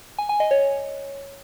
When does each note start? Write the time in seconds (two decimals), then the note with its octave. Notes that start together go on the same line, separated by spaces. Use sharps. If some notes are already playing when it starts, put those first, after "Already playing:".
0.19 G#5
0.29 G#5
0.40 D#5
0.51 C#5